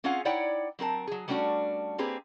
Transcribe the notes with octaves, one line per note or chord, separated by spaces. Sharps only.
C4 C#4 F4 G#4 F5 F#5
D#4 E4 C#5 D5 F#5 G5
F#3 C4 A#4 A5
F#3 G#4
G3 A3 C#4 D4 F#4
A#3 C4 G4 G#4 B4